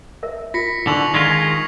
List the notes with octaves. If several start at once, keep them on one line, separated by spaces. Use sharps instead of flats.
A#4 E5
F4 A#6 B6 C#7
D3 D#4 C#6 F7 F#7
D#3 G#3 F4 G#6 B6 C7